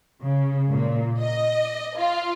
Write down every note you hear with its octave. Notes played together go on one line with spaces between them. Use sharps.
C#3
A#2
D#5
F4